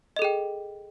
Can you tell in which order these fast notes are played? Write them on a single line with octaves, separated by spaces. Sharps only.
D#5 A4 G#4 G5